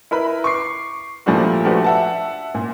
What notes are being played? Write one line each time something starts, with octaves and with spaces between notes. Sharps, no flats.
E4 A#4 B4 B5
C#6 D6 C7
A#2 F3 G3 A3 D4 F#4
F3 A3 D4 F#4 G4 B4
E5 F#5 A5
A#2